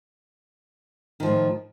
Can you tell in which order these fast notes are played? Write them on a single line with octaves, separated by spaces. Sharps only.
D#3 F3 A2